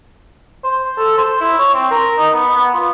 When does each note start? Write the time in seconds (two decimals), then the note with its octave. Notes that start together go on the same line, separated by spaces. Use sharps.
0.64 C5
0.97 A4
1.18 C5
1.41 E4
1.58 C#5
1.73 C4
1.91 A#4
2.18 D#4
2.33 B3
2.56 B3
2.74 F4